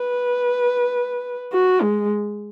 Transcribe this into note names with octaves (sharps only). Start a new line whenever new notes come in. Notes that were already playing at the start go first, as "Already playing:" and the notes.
Already playing: B4
F#4
G#3